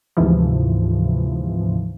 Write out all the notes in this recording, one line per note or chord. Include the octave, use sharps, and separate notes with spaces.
D2 G#2 C3 E3 F3